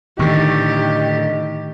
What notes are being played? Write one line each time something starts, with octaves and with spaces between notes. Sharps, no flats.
A2 D3 D#3 D#4 G4 C#6